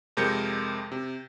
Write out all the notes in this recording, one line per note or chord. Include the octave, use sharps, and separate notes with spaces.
F2 C3 G#3 A#4 G6 C#7
C3